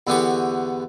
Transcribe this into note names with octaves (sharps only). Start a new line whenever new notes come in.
E2 D3 B3 G4 B5 C#6